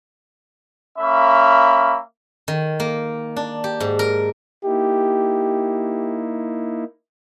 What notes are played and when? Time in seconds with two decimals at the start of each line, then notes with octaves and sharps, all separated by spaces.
0.98 A#3 C#4 E5 B5
2.48 D#3
2.80 A#3
3.36 D4
3.64 G4
3.80 G#2
3.99 A#4
4.65 A#3 D#4 E4 G4